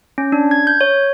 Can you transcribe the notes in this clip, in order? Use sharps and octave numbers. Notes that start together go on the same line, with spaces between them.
C#4
D4
G#6
G6
C#5